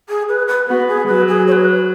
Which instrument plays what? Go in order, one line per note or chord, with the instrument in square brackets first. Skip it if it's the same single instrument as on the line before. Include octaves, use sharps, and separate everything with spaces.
[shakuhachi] G#4
B4
B4
[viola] B3 [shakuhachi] F#4
[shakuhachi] G#4
[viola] F#3 [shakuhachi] B4
[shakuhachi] G#4
C#5
B4